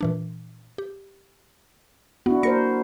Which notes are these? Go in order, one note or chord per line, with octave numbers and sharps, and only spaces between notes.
A#2 E3 D4
G4
B3 D4 E4 F#4
A#3 A#4 C5 C#6 A#6 C#7